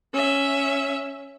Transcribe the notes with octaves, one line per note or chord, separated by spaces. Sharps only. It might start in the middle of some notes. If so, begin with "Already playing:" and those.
C#4 E5